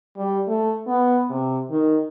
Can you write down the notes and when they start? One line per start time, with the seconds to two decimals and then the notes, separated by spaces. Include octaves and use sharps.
0.17 G3
0.47 A3
0.87 B3
1.30 C3
1.70 D#3